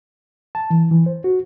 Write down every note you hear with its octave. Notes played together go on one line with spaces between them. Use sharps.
A5
E3
E3
C5
F#4